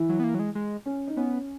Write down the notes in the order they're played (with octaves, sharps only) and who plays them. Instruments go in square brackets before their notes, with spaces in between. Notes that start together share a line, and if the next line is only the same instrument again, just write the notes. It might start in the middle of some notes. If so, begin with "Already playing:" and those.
Already playing: [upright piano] E3 E4
[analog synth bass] F#3
B3
A#3
F#3
G#3
G#3
[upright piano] C#4
D#4
[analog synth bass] B3 [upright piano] C#4